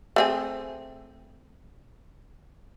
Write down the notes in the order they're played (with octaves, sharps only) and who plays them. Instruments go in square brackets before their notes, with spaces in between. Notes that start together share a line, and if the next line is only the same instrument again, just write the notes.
[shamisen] A3 C4 G#4